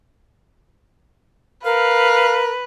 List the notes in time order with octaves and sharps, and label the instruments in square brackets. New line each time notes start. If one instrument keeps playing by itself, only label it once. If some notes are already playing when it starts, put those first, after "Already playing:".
[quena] A#4 [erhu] B4 [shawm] F5